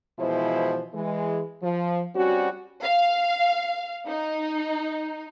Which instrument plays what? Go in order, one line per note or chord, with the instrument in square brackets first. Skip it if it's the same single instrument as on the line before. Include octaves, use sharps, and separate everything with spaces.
[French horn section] B2 E3 F3 G#3 E4 C5
E3 G#3
F3
G3 C4 C#4 F#4
[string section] F5
D#4